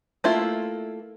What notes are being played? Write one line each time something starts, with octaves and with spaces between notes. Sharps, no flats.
A3 A#3 E4 F4